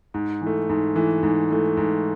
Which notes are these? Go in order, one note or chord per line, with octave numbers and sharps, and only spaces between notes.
G#2
E3 A3
G#2
E3 A3
G#2
E3 A3
G#2